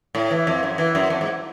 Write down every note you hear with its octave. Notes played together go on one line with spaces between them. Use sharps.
A2
E3
F2
F#2
E3
F#2
F2
G#2